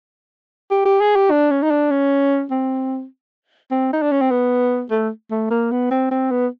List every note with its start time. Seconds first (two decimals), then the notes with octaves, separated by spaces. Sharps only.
0.71 G4
0.85 G4
1.01 G#4
1.16 G4
1.30 D4
1.51 C#4
1.63 D#4
1.71 D4
1.91 C#4
2.51 C4
3.71 C4
3.93 D#4
4.02 D4
4.12 C#4
4.21 C4
4.31 B3
4.91 A3
5.31 A3
5.50 A#3
5.71 B3
5.91 C4
6.11 C4
6.31 B3